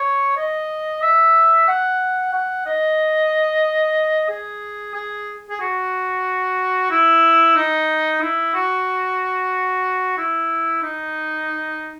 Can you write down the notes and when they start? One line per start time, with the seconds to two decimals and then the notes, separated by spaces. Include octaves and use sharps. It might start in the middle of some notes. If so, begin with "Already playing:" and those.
Already playing: C#5
0.37 D#5
1.02 E5
1.68 F#5
2.33 F#5
2.66 D#5
4.29 G#4
4.95 G#4
5.50 G#4
5.61 F#4
6.91 E4
7.56 D#4
8.21 E4
8.54 F#4
10.18 E4
10.83 D#4